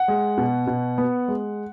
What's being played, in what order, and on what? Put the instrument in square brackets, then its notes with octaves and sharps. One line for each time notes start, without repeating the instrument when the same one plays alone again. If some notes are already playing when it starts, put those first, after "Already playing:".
Already playing: [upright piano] F#5
G#3
B2
B2
B3
G#3